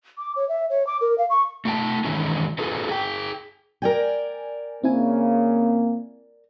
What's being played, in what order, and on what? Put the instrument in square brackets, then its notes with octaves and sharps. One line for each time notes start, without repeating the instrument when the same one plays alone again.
[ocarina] D6
C#5
E5
C#5
D6
A#4
F5
C#6
[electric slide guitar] A3 F4 G5 A5
D#3 E3 G#3 C#4 E4
F4 G#4 A4 B4
G#4 G5
[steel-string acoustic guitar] A#4 D5 G5 [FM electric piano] G#5
[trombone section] C#3 [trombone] A#3 [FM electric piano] C4 E4 G#5